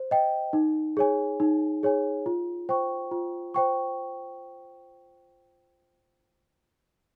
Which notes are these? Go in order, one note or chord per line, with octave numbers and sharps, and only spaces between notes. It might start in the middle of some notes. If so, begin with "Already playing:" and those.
Already playing: C5
D#5 G5
D#4
G#4 C#5 G#5
D#4
G#4 C#5 G#5
F4
C5 G5 C#6
F4
C5 G5 C#6